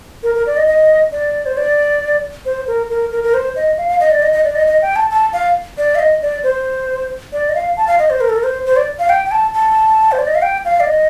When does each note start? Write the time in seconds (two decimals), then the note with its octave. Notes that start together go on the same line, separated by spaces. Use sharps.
0.23 A#4
0.35 A#4
0.46 D5
0.57 D#5
0.67 D#5
1.12 D5
1.46 C5
1.57 D5
2.46 C5
2.67 A#4
2.90 A#4
3.12 A#4
3.24 A#4
3.34 C5
3.56 D#5
3.78 F5
3.89 F5
4.00 D#5
4.11 D5
4.22 D#5
4.33 D#5
4.44 D5
4.55 D#5
4.67 D#5
4.82 G5
4.96 A5
5.11 A5
5.33 F5
5.78 D5
5.95 F5
5.99 D#5
6.22 D5
6.44 C5
7.32 D5
7.49 D#5
7.55 F5
7.77 A5
7.87 F5
7.99 D#5
8.10 C5
8.21 A#4
8.29 A4
8.36 A#4
8.44 C5
8.66 C5
8.76 D5
8.99 F5
9.09 G5
9.26 G5
9.31 A5
9.54 A5
10.12 C5
10.19 D5
10.27 D#5
10.35 F5
10.42 G5
10.65 F5
10.80 D5
10.86 D#5